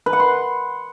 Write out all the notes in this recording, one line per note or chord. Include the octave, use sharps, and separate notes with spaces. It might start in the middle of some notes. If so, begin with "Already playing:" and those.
B4
F#5
C6